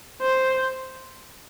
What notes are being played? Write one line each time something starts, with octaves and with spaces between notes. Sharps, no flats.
C5